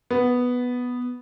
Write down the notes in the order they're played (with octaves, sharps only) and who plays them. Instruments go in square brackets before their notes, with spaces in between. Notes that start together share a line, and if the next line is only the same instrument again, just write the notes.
[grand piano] B3